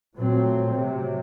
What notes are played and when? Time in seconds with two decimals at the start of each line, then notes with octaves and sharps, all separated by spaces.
0.17 A#2 F#3 A3 C4
0.68 A2 C3 F#3